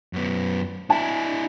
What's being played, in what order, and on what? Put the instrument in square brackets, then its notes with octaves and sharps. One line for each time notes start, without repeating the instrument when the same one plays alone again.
[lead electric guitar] F#2 B3
[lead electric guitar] D4 E4 [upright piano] G#5